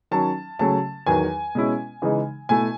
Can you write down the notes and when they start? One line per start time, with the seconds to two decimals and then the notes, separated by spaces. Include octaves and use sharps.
0.11 D#3 F#3 C#4 A5
0.59 C#3 F#3 A3 C#4 A5
1.06 E2 D#3 F#3 G#5
1.55 B2 G#3 C#4 E4
2.02 C#3 E3 G#3 D#4
2.49 B2 A3 E4 G#5